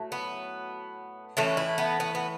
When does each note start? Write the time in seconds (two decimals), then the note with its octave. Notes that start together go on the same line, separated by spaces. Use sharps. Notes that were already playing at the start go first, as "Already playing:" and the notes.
Already playing: A2 F#3 A3
0.12 B3
1.37 A2 E3 A3 C#4
1.57 E4
1.78 B3
2.00 B3
2.15 B3